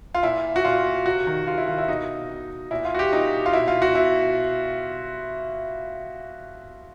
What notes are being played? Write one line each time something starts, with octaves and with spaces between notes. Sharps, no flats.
F4
A#2 E4
F#4
A#2 F4
C3 F#4
D#3
C3 F4
E4
D#3 F4
E4
B2 D#4
B2
A#2 E4
F4
F#4
G4
A#2 D#4
F4
B2 E4
F4
F#4
B2 E4